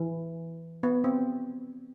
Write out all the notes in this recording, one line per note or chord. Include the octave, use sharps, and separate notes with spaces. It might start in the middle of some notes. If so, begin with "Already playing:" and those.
Already playing: E3
B3
C4